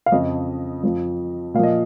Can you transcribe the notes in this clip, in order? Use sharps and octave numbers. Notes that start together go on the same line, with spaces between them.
F5
F2 C#3 F3 D#5
F2 F3
A#2 F3 D#5 F5